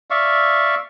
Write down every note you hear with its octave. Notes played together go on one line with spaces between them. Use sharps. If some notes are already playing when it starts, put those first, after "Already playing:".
D5 E5 F5 C#6